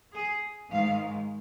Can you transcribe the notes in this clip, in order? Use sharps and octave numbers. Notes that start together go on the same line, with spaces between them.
G#4
G#2 D#3 G#3 F5